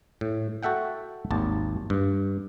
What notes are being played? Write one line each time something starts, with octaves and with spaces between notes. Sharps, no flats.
A2
F#4 A4 E5 F#5 G5
G#1 D#2 A5
G2